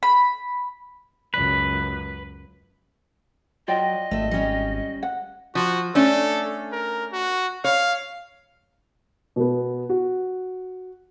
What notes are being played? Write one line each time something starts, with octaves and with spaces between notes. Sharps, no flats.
B5
C#2 F#2 B4
F#3 F4 D5 D#5 G5
G#1 A3 E5
G3 C#4
F#5
F3 F#4
A3 C#4 D4 A4
A#4
F#4
C#5 F5
B2 B3
F#4